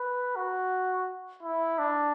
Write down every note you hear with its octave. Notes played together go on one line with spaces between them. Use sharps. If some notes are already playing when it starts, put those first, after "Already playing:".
Already playing: B4
F#4
E4
D4